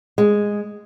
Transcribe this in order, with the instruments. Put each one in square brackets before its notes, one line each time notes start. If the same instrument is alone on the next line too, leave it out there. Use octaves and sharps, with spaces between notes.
[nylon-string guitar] G#3